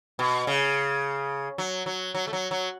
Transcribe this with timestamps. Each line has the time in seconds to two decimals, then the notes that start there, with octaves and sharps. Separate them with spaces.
0.19 B2
0.47 C#3
1.58 F#3
1.86 F#3
2.14 F#3
2.27 A3
2.33 F#3
2.51 F#3